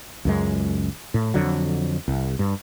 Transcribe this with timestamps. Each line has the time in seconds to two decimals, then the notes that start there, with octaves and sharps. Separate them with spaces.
0.25 C#2 F#2 G#3
1.14 A2
1.34 F2 D3 F#3
2.08 C2
2.39 G2